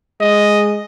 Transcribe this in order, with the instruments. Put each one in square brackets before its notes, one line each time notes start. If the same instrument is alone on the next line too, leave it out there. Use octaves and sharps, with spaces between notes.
[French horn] G#3 [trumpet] D#5